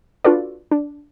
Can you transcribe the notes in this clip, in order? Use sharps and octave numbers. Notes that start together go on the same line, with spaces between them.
D4 F4 F#4 A4 B4 D5
D4